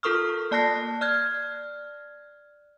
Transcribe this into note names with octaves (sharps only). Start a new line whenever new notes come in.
F4 A4 A#4 C#6 D#6 F6
A#3 D5 A5 F#6 A#6 C7
D5 F6 F#6 G#6